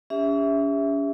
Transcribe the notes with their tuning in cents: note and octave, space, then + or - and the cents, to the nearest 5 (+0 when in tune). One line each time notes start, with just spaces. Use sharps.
C#4 +40 G4 +45 E5 +0